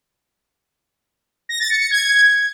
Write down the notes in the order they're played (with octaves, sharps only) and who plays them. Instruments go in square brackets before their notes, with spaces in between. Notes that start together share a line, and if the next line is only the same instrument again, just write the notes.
[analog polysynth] A#6
A6
C#7
C#7
G#6